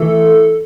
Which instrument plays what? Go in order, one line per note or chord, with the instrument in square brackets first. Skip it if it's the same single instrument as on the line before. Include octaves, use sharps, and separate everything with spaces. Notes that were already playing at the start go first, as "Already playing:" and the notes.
Already playing: [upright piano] E3 A3 [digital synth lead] A4